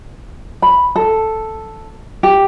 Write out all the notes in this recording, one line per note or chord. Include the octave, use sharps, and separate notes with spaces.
B5
A4
G4